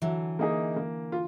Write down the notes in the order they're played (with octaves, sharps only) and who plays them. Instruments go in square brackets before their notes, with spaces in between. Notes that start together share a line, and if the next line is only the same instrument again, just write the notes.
[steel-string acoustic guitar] D3 E3 [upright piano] F#3
[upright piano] A#3 D#4 G#4
A#3
F4